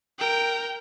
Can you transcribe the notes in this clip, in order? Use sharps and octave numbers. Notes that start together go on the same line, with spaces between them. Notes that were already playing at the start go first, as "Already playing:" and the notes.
A#4 G5